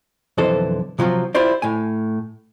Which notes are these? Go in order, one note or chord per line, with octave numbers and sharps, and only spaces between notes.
B1 F2 D3 E3 A4 C5
C3 F3 F#3 F4
E4 F4 G4 C5 D5
A2 G#5